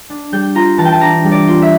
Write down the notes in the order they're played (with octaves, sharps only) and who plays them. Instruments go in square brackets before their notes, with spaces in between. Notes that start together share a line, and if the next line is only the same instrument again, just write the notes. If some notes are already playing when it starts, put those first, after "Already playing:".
[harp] D4
G3 G6
F4 A#5
E3 A5
G5
A5
D4 A#5
G3
D5
F4
E5